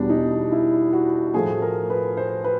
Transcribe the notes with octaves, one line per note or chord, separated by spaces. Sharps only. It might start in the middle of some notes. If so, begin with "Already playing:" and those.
Already playing: E2 B2 G3 D4
D#4
E4
F#4
A2 F3 A3 G#4
A#4
B4
C5
B4